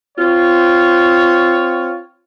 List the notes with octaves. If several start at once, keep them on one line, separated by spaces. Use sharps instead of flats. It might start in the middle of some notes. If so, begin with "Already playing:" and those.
C4 F4 C#5